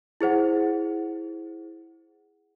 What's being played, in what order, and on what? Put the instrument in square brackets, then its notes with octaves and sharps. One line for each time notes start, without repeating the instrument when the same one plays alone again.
[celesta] E4 G#4 C5 F#5